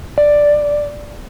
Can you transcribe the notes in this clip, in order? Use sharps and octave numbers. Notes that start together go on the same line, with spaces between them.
D5